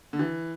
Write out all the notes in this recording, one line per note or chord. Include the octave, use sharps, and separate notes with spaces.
D3
E3